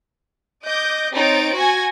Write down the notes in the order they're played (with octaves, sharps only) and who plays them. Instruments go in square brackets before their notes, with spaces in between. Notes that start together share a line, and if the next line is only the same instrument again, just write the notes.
[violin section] D#5 D6 G6
C4 D#4 C#5 A6 D7
F#4 G#5 G#6 A#6